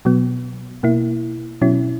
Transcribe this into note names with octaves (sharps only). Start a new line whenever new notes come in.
B2 F#3 B3
B2 A#3 E4
B2 F#3 C#4 E4